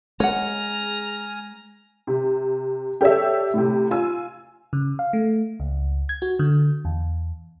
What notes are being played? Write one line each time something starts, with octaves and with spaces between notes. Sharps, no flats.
G#3 C#5 F#5 G#5 A#5 F6
C3
G4 A4 C#5 D5 E5
A2 C3
F4 G#5 E6
C#3
F5
A3
C#2
G#6
F#4
D3
E2